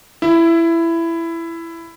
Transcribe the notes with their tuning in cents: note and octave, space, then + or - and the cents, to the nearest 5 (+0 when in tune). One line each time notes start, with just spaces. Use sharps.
E4 +15